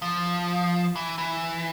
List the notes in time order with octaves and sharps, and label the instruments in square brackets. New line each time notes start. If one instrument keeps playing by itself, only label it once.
[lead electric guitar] F3
E3
E3